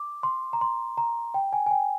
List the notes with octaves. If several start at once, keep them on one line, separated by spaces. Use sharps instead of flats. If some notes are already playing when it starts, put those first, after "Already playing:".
Already playing: D6
C6
A#5
C6
A#5
G5
G#5
G#5
G5